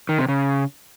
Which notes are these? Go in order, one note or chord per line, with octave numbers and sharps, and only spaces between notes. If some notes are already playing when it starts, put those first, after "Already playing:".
D#3
C3
C#3